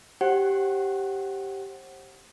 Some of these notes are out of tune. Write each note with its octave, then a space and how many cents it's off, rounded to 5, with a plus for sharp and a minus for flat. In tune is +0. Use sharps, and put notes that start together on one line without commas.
G4 -5 C5 +40 F#5 +5